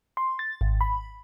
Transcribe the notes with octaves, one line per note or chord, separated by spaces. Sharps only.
C6
A6
G#1
B5